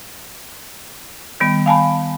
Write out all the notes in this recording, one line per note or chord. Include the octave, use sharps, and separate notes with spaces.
D#3 G3 B3
F5 G#5 A5 B5